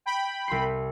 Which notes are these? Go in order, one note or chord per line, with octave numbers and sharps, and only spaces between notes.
G5 B5
C2 C6 C7